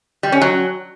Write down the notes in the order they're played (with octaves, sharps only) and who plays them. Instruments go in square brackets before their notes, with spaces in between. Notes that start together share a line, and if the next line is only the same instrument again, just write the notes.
[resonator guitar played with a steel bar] G3
C#4
F#3